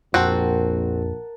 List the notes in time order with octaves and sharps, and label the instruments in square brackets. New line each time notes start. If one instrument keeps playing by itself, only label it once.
[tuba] A#1 [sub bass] F2 [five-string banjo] C4 F#4 [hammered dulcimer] A#4 F#5 A5